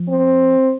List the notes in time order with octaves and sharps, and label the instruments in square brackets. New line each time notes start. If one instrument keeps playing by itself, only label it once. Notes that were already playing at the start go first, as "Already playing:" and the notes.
Already playing: [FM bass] F3
[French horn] C4